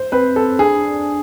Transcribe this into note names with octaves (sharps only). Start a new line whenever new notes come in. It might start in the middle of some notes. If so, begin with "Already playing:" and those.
Already playing: C5
C4 B4
A4
D4 G#4